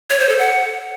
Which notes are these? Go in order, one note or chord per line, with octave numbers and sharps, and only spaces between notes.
C#5
C5
A4
F#5